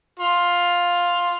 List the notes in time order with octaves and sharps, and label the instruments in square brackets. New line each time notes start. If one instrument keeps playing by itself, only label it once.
[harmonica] F4